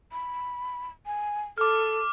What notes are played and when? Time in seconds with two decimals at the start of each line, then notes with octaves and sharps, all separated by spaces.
0.12 B5
1.06 G#5
1.58 A4 D6 F6